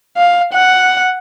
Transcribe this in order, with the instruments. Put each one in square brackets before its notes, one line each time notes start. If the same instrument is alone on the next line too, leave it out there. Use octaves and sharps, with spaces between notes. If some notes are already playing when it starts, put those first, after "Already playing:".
[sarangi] F5
F#5